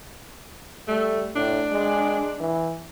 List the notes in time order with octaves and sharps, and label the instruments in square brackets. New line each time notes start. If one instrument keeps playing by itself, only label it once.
[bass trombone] G3 [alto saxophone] A3
[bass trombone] A2 [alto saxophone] D4
[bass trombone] G#3
E3